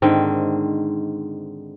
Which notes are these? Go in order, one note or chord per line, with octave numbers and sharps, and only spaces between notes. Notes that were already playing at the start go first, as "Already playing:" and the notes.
G#2 D3 D#3 C4